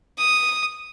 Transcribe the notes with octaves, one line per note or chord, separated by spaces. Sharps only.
D#6